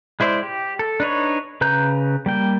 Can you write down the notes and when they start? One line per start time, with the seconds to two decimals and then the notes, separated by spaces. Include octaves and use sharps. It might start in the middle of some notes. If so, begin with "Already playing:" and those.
0.20 G#3 E4 C5 D5
0.43 G4
0.79 A4
1.00 D4 D#4 B4 C#5
1.61 C#3 B4 A#5 G6
2.26 G3 A#3 G5